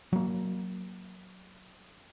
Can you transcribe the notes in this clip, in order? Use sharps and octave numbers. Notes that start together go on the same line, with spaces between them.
F#3 A#3